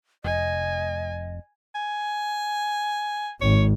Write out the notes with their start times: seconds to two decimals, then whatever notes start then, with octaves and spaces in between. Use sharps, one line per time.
0.24 F1 D#5 G#5
1.75 G#5
3.41 G#1 C#5